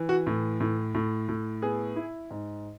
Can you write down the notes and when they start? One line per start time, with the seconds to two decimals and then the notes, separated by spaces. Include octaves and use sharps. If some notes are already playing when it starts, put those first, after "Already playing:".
Already playing: E3
0.09 F#4
0.26 A2
0.60 A2
0.94 A2
1.28 A2
1.62 B3 G#4
1.96 E4
2.30 G#2